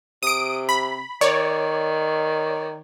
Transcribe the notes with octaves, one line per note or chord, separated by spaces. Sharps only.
C3 D#6 D7
B5
D#3 C#5 D5